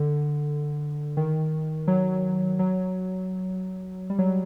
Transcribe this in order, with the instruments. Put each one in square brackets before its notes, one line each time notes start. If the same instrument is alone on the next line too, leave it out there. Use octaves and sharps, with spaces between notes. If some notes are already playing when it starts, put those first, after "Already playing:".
Already playing: [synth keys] D3
D#3
F#3
F#3
G3
F#3